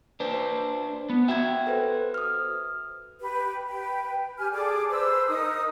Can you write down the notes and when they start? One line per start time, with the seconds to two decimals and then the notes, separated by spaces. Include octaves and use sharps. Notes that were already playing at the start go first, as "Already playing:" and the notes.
0.20 D4 B4 C5
1.10 B3
1.28 F#4 E5 G5 G#6
1.67 A4 B4 C5
2.14 D#6 F6
3.20 G4 B4
3.68 B4 G5
4.38 G4 G#5 F6
4.52 G#4 A4 D5 D6
4.89 B4 C5 E6
5.27 D#4 A#4 D#6